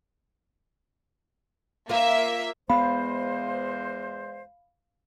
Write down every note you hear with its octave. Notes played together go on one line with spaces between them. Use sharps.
A#3 F4 A#4 E5 F5
E2 G#3 B3 C5 F5 B5